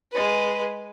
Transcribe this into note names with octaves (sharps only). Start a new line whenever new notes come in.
G#3 B4